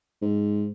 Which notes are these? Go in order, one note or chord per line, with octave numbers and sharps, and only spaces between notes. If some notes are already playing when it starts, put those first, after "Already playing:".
G#2